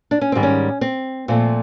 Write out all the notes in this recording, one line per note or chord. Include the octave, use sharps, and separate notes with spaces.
D4
C#4
G#2 D#3 G3 C4
C#4
C4
A#2 F3 A3 C4